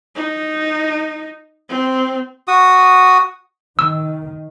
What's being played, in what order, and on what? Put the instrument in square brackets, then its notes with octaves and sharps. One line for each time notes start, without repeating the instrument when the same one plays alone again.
[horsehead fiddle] D#4
C4
[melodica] F#4 D#6
[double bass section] D#3 [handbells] E6